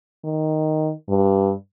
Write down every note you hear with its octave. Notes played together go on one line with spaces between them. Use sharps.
D#3
G2